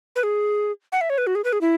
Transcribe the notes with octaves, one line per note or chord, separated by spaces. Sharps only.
B4
G#4
F#5
E5
C#5
B4
F#4
G#4
B4
G#4
E4